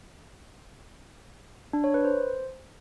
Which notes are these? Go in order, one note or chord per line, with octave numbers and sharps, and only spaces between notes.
D4
C#5
B4
C5